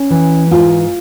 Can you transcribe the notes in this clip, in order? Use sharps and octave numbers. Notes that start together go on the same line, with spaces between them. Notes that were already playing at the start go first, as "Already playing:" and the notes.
Already playing: C#4
E3
G#2 F4